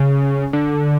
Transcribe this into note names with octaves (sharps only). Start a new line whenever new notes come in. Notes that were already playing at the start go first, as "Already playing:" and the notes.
Already playing: C#3
D3